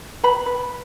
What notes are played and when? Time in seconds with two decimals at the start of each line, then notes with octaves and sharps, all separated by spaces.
0.23 B4 B5
0.46 B4